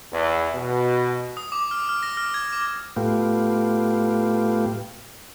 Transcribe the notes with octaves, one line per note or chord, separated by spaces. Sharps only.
E2
B2
D#6
D6
F6
F6
A#6
F6
G#6
D6
A2 A3 B3 F4 G4